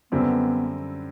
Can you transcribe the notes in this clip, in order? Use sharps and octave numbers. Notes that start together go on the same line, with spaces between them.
F#2 D3 G3 B3 C4 E4